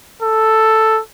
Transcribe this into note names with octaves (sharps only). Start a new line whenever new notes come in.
A4